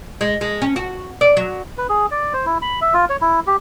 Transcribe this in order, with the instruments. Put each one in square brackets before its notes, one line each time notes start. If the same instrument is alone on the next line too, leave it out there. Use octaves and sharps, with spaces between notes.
[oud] G#3
G#3
C#4
F#4
D5
F#3
[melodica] B4
G#4
D5
C5
E4
B5
E5
F4
C#5
E4
G4